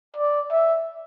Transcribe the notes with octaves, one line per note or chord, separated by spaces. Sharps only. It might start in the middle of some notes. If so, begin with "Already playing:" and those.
D5
E5